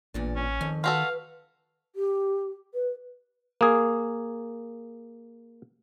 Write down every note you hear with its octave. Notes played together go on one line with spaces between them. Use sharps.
A1 E2 A#2 D4
C#4
F2 D#3
F4 F#4 A4 B4 F5
G4
B4
A#3 G#4